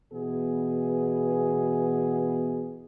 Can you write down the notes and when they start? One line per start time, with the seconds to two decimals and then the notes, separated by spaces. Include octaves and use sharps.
0.13 B2 E3 B3 G#4